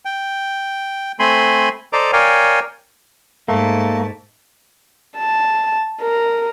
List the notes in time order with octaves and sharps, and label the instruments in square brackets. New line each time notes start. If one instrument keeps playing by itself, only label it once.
[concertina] G5
A3 C4 G#5 B5 C6
A4 C5 D5 D#5 A#5 D6
A#4 C#5 D5 F5 G5 G#5
[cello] G#2 [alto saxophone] A3 [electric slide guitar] A#3 [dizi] A5
[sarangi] A5
A#4